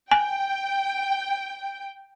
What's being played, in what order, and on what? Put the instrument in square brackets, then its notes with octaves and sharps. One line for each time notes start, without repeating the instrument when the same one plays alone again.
[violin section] G5 [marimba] G#5